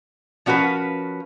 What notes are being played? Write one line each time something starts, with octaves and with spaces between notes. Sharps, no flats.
F3 C#4 F#4 A#4 B4